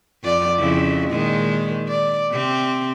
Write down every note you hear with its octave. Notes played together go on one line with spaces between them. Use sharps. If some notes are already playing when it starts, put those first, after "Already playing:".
F2 F4 D5
F2 C#3 E4
A#2 D#3 G#3
D5
C3 C4